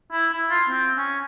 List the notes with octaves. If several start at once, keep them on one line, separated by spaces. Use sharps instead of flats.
E4
E4
F4
C4
C#4